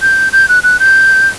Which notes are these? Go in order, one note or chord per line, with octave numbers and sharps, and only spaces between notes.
G6
G6
F#6
F#6
G6